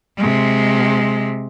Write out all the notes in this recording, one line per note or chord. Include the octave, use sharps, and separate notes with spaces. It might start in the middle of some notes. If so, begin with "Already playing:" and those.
C3 G#3